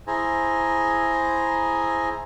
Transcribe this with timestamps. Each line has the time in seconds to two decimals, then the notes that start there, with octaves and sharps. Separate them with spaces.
0.07 E4 G#4 C5 G#5 A#5